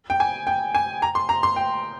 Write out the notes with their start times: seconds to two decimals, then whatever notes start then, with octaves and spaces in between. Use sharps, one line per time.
0.10 G5
0.20 G#5
0.47 G5
0.75 G#5
1.02 A#5
1.15 C6
1.29 A#5
1.43 C6
1.56 G5